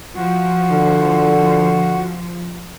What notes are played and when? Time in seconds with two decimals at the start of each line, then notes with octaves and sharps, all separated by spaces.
0.15 F3 F#4
0.70 D3